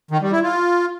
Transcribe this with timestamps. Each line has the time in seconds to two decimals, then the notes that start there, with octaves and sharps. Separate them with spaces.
0.11 D#3
0.21 G3
0.32 E4
0.42 F4